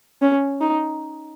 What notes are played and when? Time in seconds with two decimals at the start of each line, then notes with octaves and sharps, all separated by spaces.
0.22 C#4
0.61 D#4